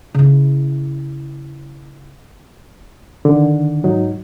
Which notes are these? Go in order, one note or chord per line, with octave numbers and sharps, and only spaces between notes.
C#3 E4
D3 D#3
G#2 F#3 D#4